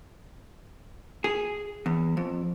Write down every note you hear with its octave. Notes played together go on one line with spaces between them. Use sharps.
G#4
E2
F2